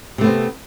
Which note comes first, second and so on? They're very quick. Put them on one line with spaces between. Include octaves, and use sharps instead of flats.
C3 A3 B3 C4